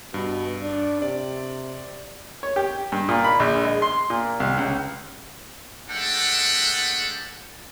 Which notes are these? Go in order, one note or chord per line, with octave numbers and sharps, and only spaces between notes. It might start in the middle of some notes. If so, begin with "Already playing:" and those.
G2 B2
D4
C3 D5
C#5
G4
G2
A#2
B5
A#1
G#3
C6
A#2
C2
C#2
G#3 A3 D4 A4 F#5 G5